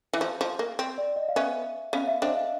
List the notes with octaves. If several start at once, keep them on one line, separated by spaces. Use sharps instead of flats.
E3
F3 A5
F3
A#3
C4
D5
D#5
F5
B3 C#4 E5
B3 C#4 F5
E5
C4 D4 D#5
F5